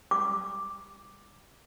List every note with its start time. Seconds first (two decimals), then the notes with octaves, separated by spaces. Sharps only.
0.11 D6 D#6